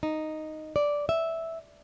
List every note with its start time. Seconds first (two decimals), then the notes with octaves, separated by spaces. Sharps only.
0.03 D#4
0.76 D5
1.09 E5